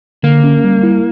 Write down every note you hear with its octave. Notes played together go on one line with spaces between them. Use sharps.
D3 A#3
C#4
G3
E4